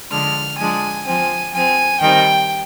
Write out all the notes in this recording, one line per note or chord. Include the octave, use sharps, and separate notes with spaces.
D3 F3 G#3 D4 F6
F3 G#3 D4 G#5
F3 C4 G#5
F3 C4 G#5
D#3 G3 C4 G5